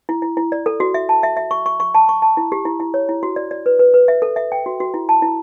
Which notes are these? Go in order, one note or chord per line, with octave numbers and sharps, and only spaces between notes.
E4
E4
E4
D5
A4
F#4
E5
A5
E5
E5
C#6
C#6
C#6
A5
C#6
A5
E4
G4
E4
E4
C#5
E4
F#4
D5
D5
B4
B4
B4
E5
A4
E5
G5
F#4
F#4
E4
A5
E4